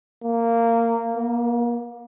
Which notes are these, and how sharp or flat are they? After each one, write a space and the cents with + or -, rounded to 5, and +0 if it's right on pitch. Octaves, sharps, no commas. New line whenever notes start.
A#3 -15
A#3 +35